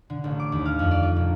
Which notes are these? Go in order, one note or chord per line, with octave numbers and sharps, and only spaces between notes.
D3
A1
D6
D#2
F5
F2
D5
F4
A#1